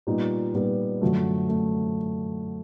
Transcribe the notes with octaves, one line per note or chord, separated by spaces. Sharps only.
A#2 G3 B3 D#4
A#2 G3 B3 D#4
F#2 D3 F#3 A3
A3